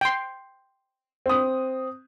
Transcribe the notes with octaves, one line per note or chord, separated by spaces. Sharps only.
G5 C6
C4 D#6